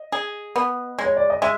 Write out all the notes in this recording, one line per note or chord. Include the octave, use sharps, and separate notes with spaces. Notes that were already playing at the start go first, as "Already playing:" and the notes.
Already playing: D#5
G#4
B3
G#3
C#5
D5
D#5
G#3 E5